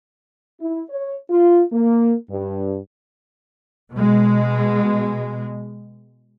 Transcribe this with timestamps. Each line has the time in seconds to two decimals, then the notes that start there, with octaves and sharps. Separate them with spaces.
0.60 E4
0.89 C#5
1.29 F4
1.71 A#3
2.29 G2
3.93 B2 G#3